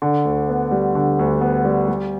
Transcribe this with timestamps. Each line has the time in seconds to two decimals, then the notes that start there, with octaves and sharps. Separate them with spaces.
0.02 D3
0.25 D2
0.49 B3
0.71 G3
0.95 D3
1.19 D2
1.41 B3
1.65 G3
1.88 G3